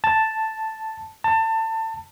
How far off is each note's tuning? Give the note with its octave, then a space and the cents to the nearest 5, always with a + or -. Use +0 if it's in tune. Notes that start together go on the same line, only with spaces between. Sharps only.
A5 +0
A5 +25